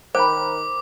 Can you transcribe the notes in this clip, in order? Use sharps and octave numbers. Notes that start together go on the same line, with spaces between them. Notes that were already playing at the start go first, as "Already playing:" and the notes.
D#3 A#4 C5 G5 B5 D6